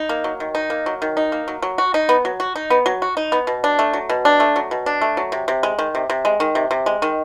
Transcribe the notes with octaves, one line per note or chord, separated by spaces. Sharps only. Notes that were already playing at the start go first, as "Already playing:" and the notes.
Already playing: D#4
A#3
F#3
D#3
D#4
A#3
F#3
D#3
D#4
A#3
F#3
F#3
F#4
D#4
B3
F#3
F#4
D#4
B3
F#3
F#4
D#4
B3
B2
D4
A3
F#3
B2
D4
A3
F#3
B2
D4
A3
F#3
C3
C3
G#3
D#3
C3
C3
G#3
D#3
C3
C3
G#3
D#3